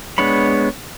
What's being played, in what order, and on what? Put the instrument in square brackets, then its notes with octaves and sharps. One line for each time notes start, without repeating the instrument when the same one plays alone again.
[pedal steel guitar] G#3 B3 D4 C#5 B5